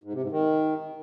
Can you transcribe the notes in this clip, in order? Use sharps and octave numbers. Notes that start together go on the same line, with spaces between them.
G#2
C3
G#2
D#3